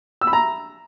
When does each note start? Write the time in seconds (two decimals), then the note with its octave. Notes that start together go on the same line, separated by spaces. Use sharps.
0.21 E6
0.27 B5
0.33 A#5